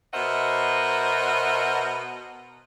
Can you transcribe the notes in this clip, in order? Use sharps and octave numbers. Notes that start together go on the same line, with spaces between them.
B2 A#4 C5 D#5 E5 F#5